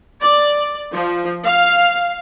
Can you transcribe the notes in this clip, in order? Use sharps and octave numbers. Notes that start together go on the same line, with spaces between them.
D5
F3
F5